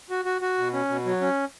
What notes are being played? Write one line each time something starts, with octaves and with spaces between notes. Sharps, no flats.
F#4
F#4
F#4
B2
C#4
B2
F#3
C#4